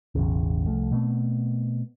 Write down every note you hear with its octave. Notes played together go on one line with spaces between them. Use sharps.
E1 A1 E2 C#3
C2 F3 A3
B2 A3 B3 C4